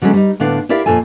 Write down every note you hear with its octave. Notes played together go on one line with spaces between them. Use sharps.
D3 F#3 G#3 A3 C#4
G3 D#4
A2 D3 B3 D4 F5
E4 G4 A#4 D5 E5 F5
F2 A#2 F4 A4 G#5